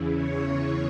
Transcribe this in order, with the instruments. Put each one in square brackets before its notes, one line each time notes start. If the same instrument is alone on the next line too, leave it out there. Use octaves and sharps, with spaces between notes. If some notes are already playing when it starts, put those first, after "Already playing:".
Already playing: [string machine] E2 C#3 E3
C#5